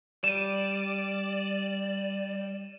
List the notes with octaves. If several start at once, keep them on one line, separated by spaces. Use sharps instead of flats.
G3 D5 D#7 E7